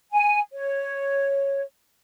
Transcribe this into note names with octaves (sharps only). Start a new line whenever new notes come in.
G#5
C#5